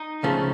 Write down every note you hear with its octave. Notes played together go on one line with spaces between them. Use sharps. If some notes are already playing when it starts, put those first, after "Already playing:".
Already playing: D#4
C#2 C#3 F3 A3